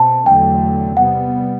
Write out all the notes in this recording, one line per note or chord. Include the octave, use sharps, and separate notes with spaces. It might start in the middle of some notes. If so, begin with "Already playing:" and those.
Already playing: B2 C4 A5
E2 D3 F#3 A3 G5
C3 G3 B3 F#5